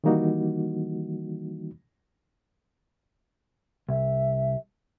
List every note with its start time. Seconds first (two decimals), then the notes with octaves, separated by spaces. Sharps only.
0.04 D#3 E3 G3 A#3 D#4 F#4
3.89 C2 E5